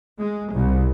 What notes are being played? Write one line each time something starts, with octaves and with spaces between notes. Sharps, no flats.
G#3
C2